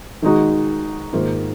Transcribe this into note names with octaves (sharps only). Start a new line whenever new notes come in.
D#3 G#3 D#4 F#4
G#2 D#3 A#3 F4